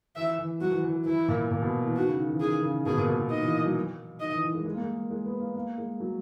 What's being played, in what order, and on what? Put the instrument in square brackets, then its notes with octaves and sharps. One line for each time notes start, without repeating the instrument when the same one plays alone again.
[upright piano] E3 [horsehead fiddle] E5
[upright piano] E3
[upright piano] F#3 [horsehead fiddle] F#4
[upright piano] E3
E3
[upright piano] E3 [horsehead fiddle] E4
[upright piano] A#2
A#2
B2
E3
[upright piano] D#3 [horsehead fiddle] F#4
[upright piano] C#3
D#3
E3
[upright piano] D#3 [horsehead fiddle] G#4
[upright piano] C#3
[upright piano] B2 [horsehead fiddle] G#4
[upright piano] A#2
B2
B2
[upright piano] D#3 [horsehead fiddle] D#5
[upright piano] E3
F#3
[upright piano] D#3 [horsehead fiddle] D#5
[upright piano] E3
E3
G#3
G#3
A#3
G#3
G#3
B3
A#3
A#3
G#3
F#3